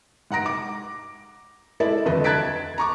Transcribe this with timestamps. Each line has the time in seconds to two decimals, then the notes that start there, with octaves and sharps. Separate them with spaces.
0.31 G#2 F#5 A#5 A#6 D7
0.46 D6
1.80 G#3 E4 A4 D5 E5
2.05 D#1 F2 D3 A4 B4 D#5
2.24 A5 F#6 G#6 A6 B6 D7
2.78 A#5 C#6 D6